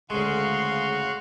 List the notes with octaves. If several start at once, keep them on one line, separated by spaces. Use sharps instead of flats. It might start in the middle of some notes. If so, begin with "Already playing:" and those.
D2 C#3 G#3 F#4 F5 C6 C#6 F#6